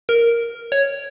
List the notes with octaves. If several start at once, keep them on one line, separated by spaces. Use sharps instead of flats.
A#4
C#5